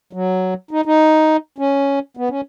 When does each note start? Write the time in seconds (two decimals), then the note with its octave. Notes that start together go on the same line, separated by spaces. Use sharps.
0.13 F#3
0.71 D#4
0.86 D#4
1.58 C#4
2.17 B3
2.29 C#4